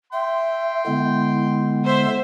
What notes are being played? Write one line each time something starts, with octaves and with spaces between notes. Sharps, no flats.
E5 G5 C6
D3 G#3 B3 E4
C5 E5